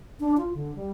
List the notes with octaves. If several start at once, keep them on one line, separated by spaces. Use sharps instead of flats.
D4
F4
D3
G3